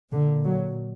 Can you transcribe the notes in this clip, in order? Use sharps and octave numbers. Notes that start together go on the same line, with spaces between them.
A#2 D3
F#3